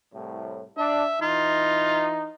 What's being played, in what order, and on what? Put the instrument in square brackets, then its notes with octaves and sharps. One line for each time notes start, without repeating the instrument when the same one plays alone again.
[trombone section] C2 A2
[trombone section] D4 [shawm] E5
[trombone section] E3 D#4 [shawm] F4